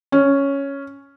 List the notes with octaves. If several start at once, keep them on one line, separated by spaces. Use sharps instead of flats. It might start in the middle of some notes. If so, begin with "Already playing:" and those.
C#4